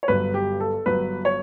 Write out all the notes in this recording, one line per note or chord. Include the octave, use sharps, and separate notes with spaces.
C#5
G1 G2 F#3 B4
G4
A4
G1 G2 F#3 B4
C#5